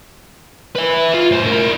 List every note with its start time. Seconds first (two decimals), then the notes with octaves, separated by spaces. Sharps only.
0.76 B4 E5
1.14 F4
1.32 A2 C5
1.45 E4 A#4